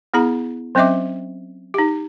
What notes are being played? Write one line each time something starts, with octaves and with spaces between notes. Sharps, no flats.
B3 E4 G#4 A#5
F#3 C4 C#4 D#5 E5 D6
D#4 G4